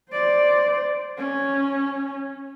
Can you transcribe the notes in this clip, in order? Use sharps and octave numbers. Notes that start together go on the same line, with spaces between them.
C5 D5
C#4